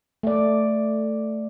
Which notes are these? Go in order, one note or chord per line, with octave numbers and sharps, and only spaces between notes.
A3 D5